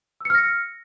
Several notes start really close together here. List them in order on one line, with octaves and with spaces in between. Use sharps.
E6 C#7 F6 A#6